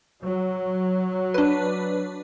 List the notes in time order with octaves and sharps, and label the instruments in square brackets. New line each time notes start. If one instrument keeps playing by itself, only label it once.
[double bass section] F#3
[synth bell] D4 B4